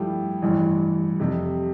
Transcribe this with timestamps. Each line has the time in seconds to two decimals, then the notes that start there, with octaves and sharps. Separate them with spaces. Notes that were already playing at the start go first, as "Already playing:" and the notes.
Already playing: G2 F3 A3 E4 G4
0.42 A1 G2 E3
1.19 F2 C3 G3